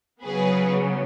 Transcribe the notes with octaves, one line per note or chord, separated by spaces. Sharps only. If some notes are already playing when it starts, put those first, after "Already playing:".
C#3 F#3 B3 G#4 B4